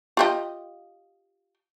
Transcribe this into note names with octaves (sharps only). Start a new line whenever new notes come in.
F4 G4 D#5